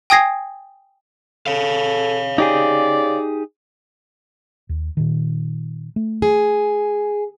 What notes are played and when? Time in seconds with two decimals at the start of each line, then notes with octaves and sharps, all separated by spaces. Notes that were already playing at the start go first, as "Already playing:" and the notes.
0.10 G5 G#5 D#6 G#6 A#6 C7
1.47 A4 C#5 F5
2.38 C#3 D#4 G4 G#4 D5
4.69 D#2
4.97 A#2 D#3
5.96 A3
6.22 G#4